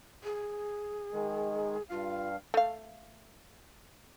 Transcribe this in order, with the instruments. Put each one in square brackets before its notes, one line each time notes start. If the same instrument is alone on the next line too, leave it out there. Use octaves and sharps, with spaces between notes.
[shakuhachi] G#4
[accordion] D#3 G#3
[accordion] G2 F5 [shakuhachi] F4
[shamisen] A3 F5